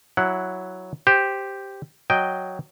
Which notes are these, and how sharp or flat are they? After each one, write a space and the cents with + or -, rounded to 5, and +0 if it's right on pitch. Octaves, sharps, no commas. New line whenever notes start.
F#3 +0 E4 +0 F#5 +0
G4 +0 C5 +0
F#3 +0 D#5 +0 G5 +0